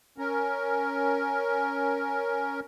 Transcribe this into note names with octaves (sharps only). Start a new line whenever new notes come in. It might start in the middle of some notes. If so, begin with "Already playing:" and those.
C#4 A#4